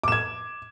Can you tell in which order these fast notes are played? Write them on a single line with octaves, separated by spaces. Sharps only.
D6 E7 G#6